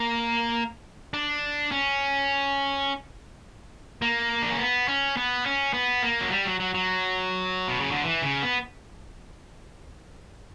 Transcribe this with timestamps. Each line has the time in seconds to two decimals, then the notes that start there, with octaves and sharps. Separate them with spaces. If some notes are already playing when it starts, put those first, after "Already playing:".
Already playing: A#3
1.14 D4
1.71 C#4
4.02 A#3
4.42 D4
4.51 C#4
4.59 B3
4.88 C#4
5.17 B3
5.46 C#4
5.73 B3
6.03 A#3
6.21 F#3
6.31 G3
6.45 F#3
6.60 F#3
6.74 F#3
7.68 B2
7.80 C#3
7.91 D3
8.04 E3
8.22 C#3
8.42 B3